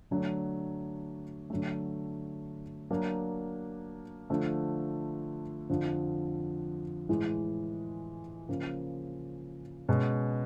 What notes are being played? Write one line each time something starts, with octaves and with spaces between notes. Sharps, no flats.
D3 F#3 A3 D4
D3 F#3 A3
F#3 A#3 D4
D3 F3 A3
F2 D3 F3
A2 E3 G#3
C#3 F3 A#3
B2 G#3 C#4